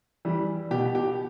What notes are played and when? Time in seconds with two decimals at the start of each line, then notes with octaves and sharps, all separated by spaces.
0.25 E3 G3
0.71 B2 G4
0.95 G4